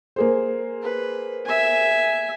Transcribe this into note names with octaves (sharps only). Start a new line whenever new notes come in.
A#3 G#4 C5
B4
E5 G#5